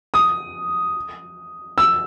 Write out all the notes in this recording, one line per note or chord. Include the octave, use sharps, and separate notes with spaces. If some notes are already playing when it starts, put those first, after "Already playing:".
D#6
E6